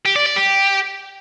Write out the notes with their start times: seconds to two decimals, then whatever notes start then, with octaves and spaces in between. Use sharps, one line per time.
0.05 G4
0.16 D5
0.26 D5
0.37 G4